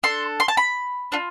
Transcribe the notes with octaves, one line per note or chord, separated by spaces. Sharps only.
D4 A4 C6
C6
A5
B5
D4 F4